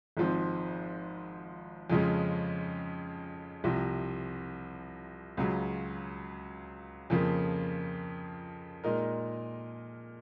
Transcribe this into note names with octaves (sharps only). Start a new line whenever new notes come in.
G#1 G#2 F3 C4
F2 C#3 F3 G#3 C#4
C2 C3 F3
C#2 C#3 F#3
F2 C#3 F3 A#3
A#2 G#3 D#4 A#4